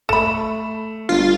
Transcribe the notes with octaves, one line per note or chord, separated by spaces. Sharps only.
A3 A4 B5 E7
G1 F4